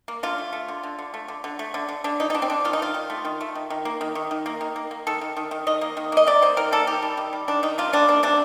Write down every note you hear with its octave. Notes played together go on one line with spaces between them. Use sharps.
A#3
D3 F4
A3
A3
D3
D3
D3
A3
D3
D3
A3
D3
D3
D3 D4
F3 D#4
D#4
D3 D4
C4
D3 D4
D#3 F4
D#4
D#3 F4
D#3
A3
D#3
A3
D#3
D#3
A#3
D#3
D#3
D#3
A#3
D#3
A#3
A#3
D#3 A4
D#3
D#3
D#3
D#3 D#5
A#3
D#3
A#3 D#5
C3 D5
A#3 C5
D#3 A#4
A#3 A4
D#3 G4
G3
D#3
G3
D#3 D4
D#3 D#4
A#3 F4
G3 D4
A#3 D4
C3 D4